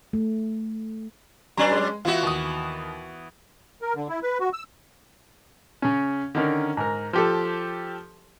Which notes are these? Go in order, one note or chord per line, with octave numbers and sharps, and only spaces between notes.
A3
F#3 C#4 D4 B4 G#5 A#5
G#3
E3 B3 F4 F#4 E5
D#2 D#6
A#4
D3
E4
B4
F#4
E6
C#3 C#4
D3 D#3 C#4 A#4
G#2 A#4
F3 G4 A4